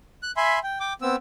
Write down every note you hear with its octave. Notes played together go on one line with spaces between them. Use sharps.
F#6
E5 G#5 B5 C6
G5
G5 D6
B3 C4 E6